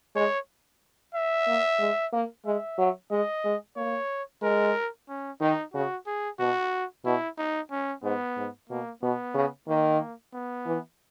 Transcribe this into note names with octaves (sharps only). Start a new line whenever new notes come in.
G#3 C#5
E5
A#3
G#3
A#3
G#3 E5
F#3
G#3 D#5
G#3
A#3 C#5
G#3 A#4
C#4
D#3 D#4
C#3 F#4
G#4
B2 F#4
B2 E4
D#4
C#4
G#2 B3
G#2
B2 A#3
B2 B3
C#3
D#3 A#3
B3
E3